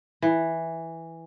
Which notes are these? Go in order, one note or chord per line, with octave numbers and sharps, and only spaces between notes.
E3